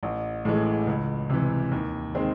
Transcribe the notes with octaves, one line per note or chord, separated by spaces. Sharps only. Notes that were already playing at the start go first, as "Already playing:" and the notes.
A1
A2 E3 G#3
C#2
C3 E3
D#2
D#3 G#3 C4